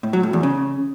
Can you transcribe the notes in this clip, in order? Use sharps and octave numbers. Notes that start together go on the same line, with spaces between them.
A2
F#3
A2
E2
C#3